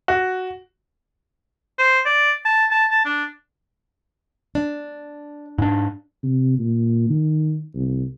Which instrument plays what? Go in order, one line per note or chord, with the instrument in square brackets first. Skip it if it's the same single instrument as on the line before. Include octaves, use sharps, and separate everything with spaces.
[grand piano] F#4
[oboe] C5
D5
A5
A5
A5
D4
[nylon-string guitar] D4
[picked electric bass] G#2 D4
[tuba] C3
A#2
D#3
C2